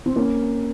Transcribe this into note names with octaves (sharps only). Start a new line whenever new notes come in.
C4
A#3 C#4